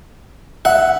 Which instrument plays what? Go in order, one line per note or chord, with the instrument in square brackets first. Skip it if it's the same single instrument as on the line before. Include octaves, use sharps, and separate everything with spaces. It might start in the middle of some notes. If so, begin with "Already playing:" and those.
[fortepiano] E5 [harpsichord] F#5